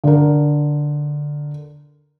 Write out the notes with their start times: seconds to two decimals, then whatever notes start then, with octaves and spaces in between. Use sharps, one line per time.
0.04 D3 A#4